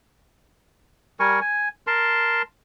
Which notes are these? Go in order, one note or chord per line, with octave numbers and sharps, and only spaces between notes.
G3 A#4 G#5 C#6
G#5
A#4 A5 C6